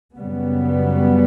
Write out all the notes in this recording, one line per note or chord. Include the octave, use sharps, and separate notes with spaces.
F#2 C#3 G3 B3